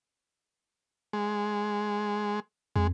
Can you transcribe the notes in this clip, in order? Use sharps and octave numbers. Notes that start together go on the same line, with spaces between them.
G#3
F2 G#3